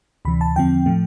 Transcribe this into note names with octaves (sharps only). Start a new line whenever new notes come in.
D2 C3 E3 B5
A5
E2 D3 F3 C4 G5
A2 F3 A3